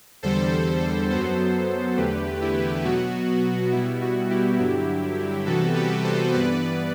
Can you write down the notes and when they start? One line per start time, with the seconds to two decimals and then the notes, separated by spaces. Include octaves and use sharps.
0.23 E2 D3 G3 A4 C5
1.10 F#2 F#3 B3 A4 C5
1.97 E2 D3 A3 G4 B4
2.41 E4 G4
2.84 B2 F#3 B3 F#4
3.72 B2 G3 B3 E4
4.01 F#4
4.30 E4 G4
4.59 G2 D3 F#3 E4 G4
5.46 C3 E3 G3 B3 F#4 A4
5.75 G4 B4
6.04 A4 C5
6.33 G2 E3 B3 B4 D5